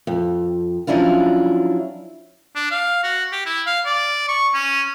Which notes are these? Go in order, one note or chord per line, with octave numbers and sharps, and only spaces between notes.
F2
F3 F#3 C#4 D4 E4 F4
D4
F5
F#4
G4
E4
F5
D5
C#6
C#4